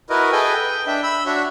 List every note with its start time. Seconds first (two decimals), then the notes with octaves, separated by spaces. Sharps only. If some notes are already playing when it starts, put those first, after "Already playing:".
0.10 E4 F#4 A#4 B4 D#5
0.32 G#4 A4 B4 D#5 G5 G#5
0.54 G5
0.87 D4 E5 G5
1.03 B5 E6
1.26 D4 F#4 C#5 E5